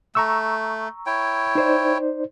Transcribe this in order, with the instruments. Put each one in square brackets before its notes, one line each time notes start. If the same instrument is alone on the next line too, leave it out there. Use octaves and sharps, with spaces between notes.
[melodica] A3 [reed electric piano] A#5 C#6 E6
[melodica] E4 C#5 G5
[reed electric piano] D#4 C5 D5